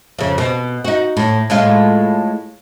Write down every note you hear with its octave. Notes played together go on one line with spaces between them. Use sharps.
F2 C#3
B2
D#4 F#4
A2
A2 G#3 F4